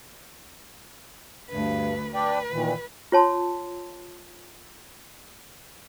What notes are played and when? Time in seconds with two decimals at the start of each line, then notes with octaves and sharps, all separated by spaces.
1.50 D2 G2 B4
2.15 D4 B4 D5 G5
2.52 A#2 D#3 E3
3.12 F4 C#5 A5 C6